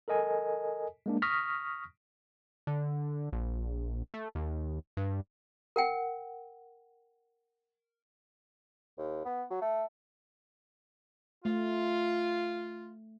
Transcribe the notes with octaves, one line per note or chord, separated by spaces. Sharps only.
A4 A#4 D#5 G#5
G#3 A#3 D4
C#6 D#6 F6 A#6 B6
D3
A#1
A3
D#2
G2
A#4 F#5 G5
D#2
B3
F#3
A3
A3 F4